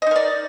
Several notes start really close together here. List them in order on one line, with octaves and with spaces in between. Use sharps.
D#5 D#4 A#4 D5